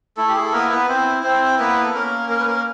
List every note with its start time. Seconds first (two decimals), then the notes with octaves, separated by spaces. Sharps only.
0.17 A3 E4 A4
0.28 G4
0.36 G#4
0.45 A4
0.52 A#3 B3 A#4
0.70 B3 B4
0.88 C4 E4 C5
1.23 C4 E4 C5
1.58 A#3 B3 B4
1.84 A4
1.94 A#3 C#4 A#4
2.29 A#3 A#4
2.39 B4
2.46 A#3 A#4